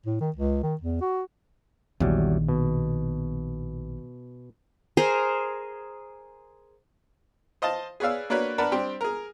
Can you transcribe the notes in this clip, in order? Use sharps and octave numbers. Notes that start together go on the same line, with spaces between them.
A2
D#3
C#2
D#3
E2
F#4
A#1 E2 D#3 F#3 G3
B2
G#4 A#4 C5 A#5
C5 D#5 F5 A5
G#4 B4 C#5 D5 F5 E6
A#3 D4 F#4 B4 C#5
D4 A#4 B4 F#5 A5 B5
G3 C4 D4 G4 C5 G5
G#4 A#4